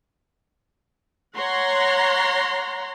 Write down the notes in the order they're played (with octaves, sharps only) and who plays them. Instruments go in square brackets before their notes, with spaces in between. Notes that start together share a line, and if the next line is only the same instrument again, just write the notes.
[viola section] C#5 F#5 A#5 C6